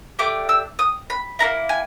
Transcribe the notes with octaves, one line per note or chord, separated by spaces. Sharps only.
A3 D4 G4 D6
E6
D#6
B5
A#3 C#4 E4 A#5
G#5